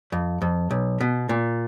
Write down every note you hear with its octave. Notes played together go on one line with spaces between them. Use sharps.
F2
F2
B1
B2
A#2